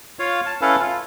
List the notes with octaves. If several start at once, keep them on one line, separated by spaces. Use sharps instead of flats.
F4 C#5 F5
A5
C#4 E4 A4 B4 F5
F4